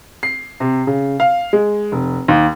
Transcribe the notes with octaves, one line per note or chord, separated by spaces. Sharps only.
C7
C3
C#3
F5
G#3
F1
D#2